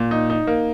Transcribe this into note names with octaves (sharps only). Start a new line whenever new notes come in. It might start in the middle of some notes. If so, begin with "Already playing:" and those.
Already playing: A#2
D#4
D#4
A#3